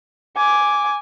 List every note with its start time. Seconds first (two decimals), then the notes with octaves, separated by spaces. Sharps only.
0.37 G#5 D6